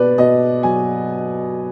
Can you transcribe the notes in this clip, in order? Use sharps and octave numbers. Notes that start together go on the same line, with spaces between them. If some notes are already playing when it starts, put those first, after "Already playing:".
Already playing: B2 B4 D5
B2 D#5
F#3 G#5